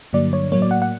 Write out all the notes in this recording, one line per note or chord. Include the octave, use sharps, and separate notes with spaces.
G2 D3 F#3 A#3 D5
C#5
A2 F#3 A#3 C#5
D5
F#5
F#5